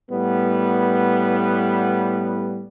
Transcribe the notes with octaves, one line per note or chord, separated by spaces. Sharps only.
A2 G3 B3